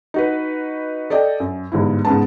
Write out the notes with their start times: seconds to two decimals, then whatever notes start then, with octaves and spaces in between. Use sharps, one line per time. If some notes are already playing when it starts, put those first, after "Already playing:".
0.14 D#4 F#4 B4
1.10 A4 D5 D#5 G5
1.40 F#2
1.72 G1 G#2 E4
2.05 G#2 C#3 B3 A5